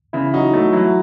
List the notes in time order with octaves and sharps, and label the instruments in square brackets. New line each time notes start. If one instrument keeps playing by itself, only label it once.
[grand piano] C#3 [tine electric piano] E3 E4
[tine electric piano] F#3 F#4 [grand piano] D#4
[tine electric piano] F#3 F#4 [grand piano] A3
[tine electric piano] E3 E4 [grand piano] F#3